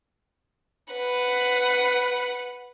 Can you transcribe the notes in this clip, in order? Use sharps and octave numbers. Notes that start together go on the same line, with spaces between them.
B4 F#5